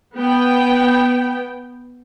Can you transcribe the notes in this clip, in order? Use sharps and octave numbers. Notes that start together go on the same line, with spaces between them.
B3 G5